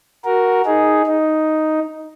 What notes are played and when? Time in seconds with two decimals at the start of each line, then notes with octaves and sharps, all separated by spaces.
0.25 F#4 A#4
0.66 D#4 G#4
1.06 D#4